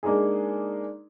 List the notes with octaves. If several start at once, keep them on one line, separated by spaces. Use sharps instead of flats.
G#3 A#3 D4 D#4 G#4